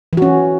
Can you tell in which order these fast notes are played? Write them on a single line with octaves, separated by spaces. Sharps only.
E3 F#4 C#4